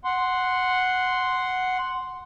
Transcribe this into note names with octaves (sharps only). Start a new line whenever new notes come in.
F#5 C6